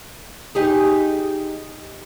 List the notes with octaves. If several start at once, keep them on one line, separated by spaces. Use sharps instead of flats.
D#4 G4 G#4